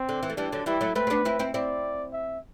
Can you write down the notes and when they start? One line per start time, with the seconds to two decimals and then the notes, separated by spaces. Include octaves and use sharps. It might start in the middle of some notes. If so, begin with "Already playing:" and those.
Already playing: C4
0.09 D3
0.23 E3
0.30 A3
0.37 E3 G3 D4
0.52 D3 F#3
0.66 E3 G3 E4
0.81 F#3 A3
0.95 A3 C4 B4
1.07 C4
1.10 B3 D4
1.25 C4 E4
1.39 C4 E4
1.54 C4 E4 D5
2.13 E5